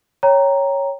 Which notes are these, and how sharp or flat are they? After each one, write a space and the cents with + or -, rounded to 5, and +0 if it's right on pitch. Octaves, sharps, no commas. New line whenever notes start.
C#5 +0 G5 +0 A#5 +0